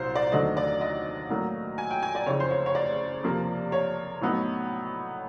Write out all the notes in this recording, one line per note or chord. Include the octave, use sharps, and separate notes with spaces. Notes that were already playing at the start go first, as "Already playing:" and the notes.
Already playing: C2 A#2 F#3 C5
D5
D#2 D3 F#3 A3 D#5
D5
D#5
A2 F#3 A#3
G#5
G5
G#5
D5
F#1 F2 C#3 C#5
C5
C#5
C#5
D5
F2 C3 F3 A#3
C#5
A2 F#3 B3 D#4